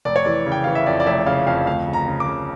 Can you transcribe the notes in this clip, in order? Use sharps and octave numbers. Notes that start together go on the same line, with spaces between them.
F1 D5
C#5
E3 D5
C#3
G5
E3 F5
E5
F2 D5
D5
F1 E5
C#3 F5
F2 F5
D2 F5
C#3
A#5
C#3
D6
C#3